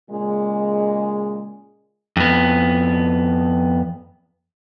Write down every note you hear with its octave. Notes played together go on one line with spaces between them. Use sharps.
A#2 C#3 G#3
F2 B3